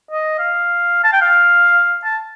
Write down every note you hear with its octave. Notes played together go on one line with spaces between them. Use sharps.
D#5
F5
A5
G5
F5
A5